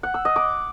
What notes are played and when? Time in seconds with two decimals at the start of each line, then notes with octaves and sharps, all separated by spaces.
0.03 F#5
0.14 E6
0.25 D#5
0.36 D6